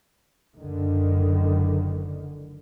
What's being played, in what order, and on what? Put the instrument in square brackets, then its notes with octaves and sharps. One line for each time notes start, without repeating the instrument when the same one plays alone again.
[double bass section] F#1 C#2 D3 D#3